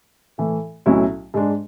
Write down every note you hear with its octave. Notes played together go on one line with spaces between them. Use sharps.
A2 E3 A3
B1 A2 F#3 C#4 E4
G#2 G#3 D4